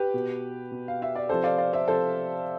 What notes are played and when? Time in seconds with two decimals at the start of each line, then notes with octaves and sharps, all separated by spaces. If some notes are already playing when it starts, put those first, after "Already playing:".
Already playing: G4 B4
0.14 B2
0.72 B2
0.88 F5
1.02 E5
1.16 D5
1.29 C3 F3 A4 C5
1.44 D5 F5
1.58 D5 F5
1.73 C5 E5
1.87 C3 F3 A4 C5